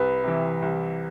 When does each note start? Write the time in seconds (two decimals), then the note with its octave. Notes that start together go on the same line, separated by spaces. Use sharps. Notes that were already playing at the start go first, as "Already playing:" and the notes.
Already playing: C2 B4
0.23 C3 E3
0.62 C2